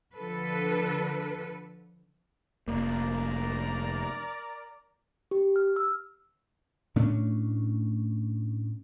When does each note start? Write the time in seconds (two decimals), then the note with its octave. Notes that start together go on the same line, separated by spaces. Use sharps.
0.15 D3 F3 A4 B4
2.68 F1 A#3 A#4 D5 A#5
5.31 G4
5.56 F6
5.76 E6
6.96 A2 A3 C#4 D4